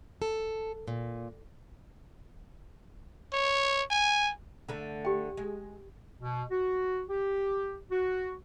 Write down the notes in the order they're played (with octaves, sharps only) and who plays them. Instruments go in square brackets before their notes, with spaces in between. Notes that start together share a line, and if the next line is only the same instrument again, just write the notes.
[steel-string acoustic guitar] A4
A#2
[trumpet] C#5
G#5
[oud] D3 A3
[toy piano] G4 G5
[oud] G#3
[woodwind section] B2
F#4
G4
F#4